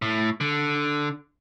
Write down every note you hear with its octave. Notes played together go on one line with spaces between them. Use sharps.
A2
D3